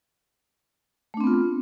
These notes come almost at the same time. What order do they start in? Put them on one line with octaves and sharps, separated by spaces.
A3 D4 C4 B3 F4